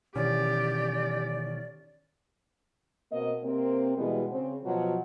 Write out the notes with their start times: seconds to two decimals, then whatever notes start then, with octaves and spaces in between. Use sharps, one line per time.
0.16 B2 D#3 E3 C#4 G4 D5
3.11 B2 A#3 C4 D#5
3.43 C3 A#3 C4
3.97 B2 E3 G3 G#3 B3
4.31 C#3 C4
4.64 B2 F3 F#3